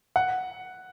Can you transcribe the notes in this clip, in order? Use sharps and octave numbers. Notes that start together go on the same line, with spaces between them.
F#5